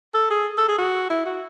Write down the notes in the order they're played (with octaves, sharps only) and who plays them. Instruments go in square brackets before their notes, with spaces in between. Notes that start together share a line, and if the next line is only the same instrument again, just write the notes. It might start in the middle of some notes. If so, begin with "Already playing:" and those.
[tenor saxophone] A4
G#4
A4
G#4
F#4
E4
F#4